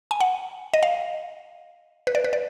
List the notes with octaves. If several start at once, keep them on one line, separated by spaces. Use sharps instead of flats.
G#5
F#5
D#5
F5
B4
D5
B4
D5